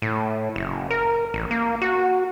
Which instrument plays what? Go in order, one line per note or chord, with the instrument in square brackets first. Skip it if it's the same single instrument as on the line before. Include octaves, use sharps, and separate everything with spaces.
[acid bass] A2
F#1
A#4
A1
A#3
F#4